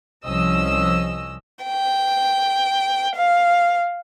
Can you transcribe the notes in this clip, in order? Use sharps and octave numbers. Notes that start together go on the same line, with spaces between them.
C2 F3 C#4 D#5 E6
G5
F5